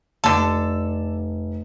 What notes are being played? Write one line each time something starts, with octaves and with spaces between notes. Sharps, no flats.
F1 D3 A4